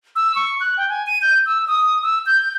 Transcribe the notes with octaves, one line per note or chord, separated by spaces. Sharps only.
E6
C#6
F#6
G5
G#5
D#7
G6
E6
D#6
E6
G6